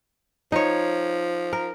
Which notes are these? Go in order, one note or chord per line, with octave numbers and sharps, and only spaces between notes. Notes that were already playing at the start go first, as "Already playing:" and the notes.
F3 D#4 C#5
A#4